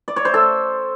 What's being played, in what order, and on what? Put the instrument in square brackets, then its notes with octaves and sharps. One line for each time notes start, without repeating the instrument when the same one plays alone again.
[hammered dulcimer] D5
C#5
C5
A4